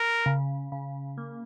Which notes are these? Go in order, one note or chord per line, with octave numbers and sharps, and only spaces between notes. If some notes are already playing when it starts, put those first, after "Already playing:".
Already playing: A#4
C#3
C#3
A#3